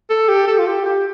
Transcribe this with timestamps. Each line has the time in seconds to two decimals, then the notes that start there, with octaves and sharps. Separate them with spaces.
0.10 A4
0.29 G4
0.48 A4
0.58 F4
0.67 G4
0.86 G4